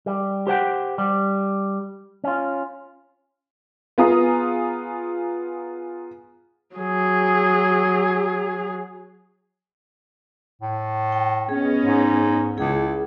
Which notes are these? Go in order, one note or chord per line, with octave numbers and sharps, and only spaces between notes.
G3
G4 C5 F#5 G5
G3
C#4 F4
B3 F4 G#4 A#5 D#6
F#3 G#4
A2
G5
B3 C#4 G#4 D#5
G#2
C#2 C#3 E4 G#4